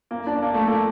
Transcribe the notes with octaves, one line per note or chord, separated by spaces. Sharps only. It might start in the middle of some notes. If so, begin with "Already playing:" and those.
A#3
D4
A#3
A3
A#3